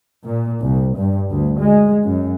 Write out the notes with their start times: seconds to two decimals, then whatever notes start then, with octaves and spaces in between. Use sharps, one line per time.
0.24 A#2
0.62 C2
0.97 G2
1.30 D2
1.59 G#3
2.04 F#2